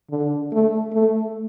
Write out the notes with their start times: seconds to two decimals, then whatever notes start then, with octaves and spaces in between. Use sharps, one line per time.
0.10 D3
0.52 A3
0.93 A3